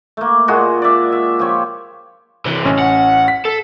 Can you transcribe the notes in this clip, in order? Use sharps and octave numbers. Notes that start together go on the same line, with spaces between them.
A3 A#3
A#2 G#3 F#4 G#4
D5 E5
E5
F3 G4 C#5
C3 E3
A1 C#4
F#5
B6
A4